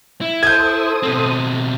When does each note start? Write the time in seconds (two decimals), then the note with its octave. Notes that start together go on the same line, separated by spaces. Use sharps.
0.21 E4
0.43 A4 C5 D#6 G6 G#6
1.03 B2 C4